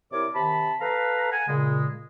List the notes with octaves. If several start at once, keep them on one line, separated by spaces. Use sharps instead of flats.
C3 E4 A#4 C#5 D5 D6
C3 D#3 A5 B5
A4 B4 F5 A#5
F#5 G#5
A#2 C#3 G#3